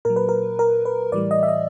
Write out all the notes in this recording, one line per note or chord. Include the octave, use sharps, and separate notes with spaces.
A#2 F#3 A#4
B4
A#4
A#4
B4
A2 E3 G3 D5
D#5
E5
D#5